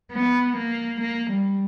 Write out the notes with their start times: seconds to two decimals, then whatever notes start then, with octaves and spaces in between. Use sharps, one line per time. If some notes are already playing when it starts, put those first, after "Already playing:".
0.12 B3
0.57 A#3
1.01 A#3
1.31 G3